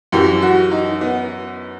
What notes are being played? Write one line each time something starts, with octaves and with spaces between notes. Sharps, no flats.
F#2 E3 G4
F#4
D#4
B3